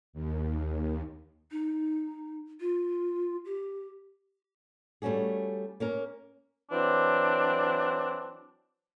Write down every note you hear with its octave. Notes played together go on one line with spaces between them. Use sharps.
D#2
D#4
F4
G4
G3 A3 C#4 F#4 G#4
A#3 C#4 A#4
E3 F#3 C4 D4